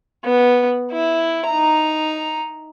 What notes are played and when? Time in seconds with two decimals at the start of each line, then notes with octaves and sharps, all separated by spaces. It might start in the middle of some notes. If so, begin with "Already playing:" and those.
0.24 B3
0.92 E4
1.46 D#4 A#5